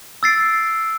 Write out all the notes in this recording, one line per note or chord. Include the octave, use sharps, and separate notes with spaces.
E6 A6 C7 D7